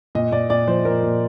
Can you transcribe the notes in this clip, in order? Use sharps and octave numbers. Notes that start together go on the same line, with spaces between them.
A#2 D#5
A#2 D5
A#2 D5
F3 C5
A#2 A#4
A#2